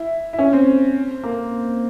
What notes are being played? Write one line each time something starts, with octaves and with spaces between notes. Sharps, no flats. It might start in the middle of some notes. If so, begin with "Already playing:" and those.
Already playing: E4
E4
C#4
C4
A#3